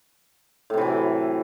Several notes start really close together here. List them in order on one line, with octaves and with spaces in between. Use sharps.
A2 C3 E3 F#3